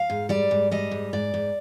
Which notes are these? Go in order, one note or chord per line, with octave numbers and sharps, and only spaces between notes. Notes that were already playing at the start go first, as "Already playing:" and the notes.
Already playing: F5
G#2
G3 D5
G#2
G3 D#5
G#2
G#2 D5
G#2